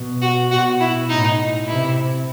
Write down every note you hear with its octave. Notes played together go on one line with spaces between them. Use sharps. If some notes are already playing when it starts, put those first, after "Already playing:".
Already playing: B2
F#4
B2 F#4
E4
A2 D#4
C3 E4